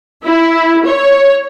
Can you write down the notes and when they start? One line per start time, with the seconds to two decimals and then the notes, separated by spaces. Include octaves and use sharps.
0.24 E4
0.85 C#5